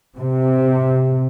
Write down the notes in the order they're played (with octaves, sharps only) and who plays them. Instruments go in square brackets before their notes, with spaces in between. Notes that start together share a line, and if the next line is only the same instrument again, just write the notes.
[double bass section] C3